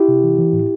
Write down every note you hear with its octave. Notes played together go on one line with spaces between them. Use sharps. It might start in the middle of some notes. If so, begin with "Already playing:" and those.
Already playing: E4 G4
C3
E3
E3
A2